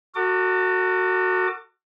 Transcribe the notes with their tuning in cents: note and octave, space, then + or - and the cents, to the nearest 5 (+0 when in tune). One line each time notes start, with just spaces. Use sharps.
F#4 +0 A4 +45 D6 +20